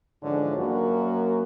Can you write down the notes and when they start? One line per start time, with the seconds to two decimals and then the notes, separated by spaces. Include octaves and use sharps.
0.23 G#2 D3 E3 F3 C#4 D4
0.57 F#2 A#3 F#4